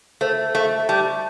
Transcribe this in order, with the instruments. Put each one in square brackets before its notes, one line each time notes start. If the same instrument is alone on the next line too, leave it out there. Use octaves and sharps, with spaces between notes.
[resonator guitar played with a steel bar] A3 [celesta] C5
[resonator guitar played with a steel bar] A3 [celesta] E5
[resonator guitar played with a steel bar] G3 [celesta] A5